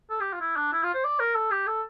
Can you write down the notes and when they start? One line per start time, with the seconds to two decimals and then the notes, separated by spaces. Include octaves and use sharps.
0.10 A4
0.20 G4
0.33 F4
0.40 E4
0.56 D4
0.73 E4
0.83 F4
0.94 C5
1.04 D5
1.19 A#4
1.35 A4
1.51 G4
1.67 A4